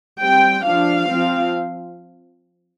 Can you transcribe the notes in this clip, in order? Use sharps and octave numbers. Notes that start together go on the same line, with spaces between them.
G3 C4 G5
F3 D4 F5
F3 C4